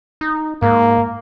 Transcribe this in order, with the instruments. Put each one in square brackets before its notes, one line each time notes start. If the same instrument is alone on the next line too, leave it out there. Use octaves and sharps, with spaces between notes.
[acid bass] D#4
[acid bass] G#2 [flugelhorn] A#3